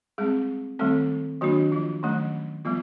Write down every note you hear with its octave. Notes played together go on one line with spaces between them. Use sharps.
G3 G#3 C4 G#4
D#3 G3 A3 C4 A4
D#3 F#3 A#3 D4 F#4
F3 F4
D#3 F#3 A3 C#4
F3 G3 B3 F4